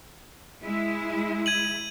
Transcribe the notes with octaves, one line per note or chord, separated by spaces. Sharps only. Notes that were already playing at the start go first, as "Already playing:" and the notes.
G#3 E4
G#6 D#7 F#7